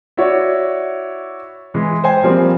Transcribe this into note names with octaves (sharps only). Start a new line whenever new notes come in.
E4 F#4 C#5 D5
E3 G#3
C5 G5 G#5
F3 G3 A#3 C4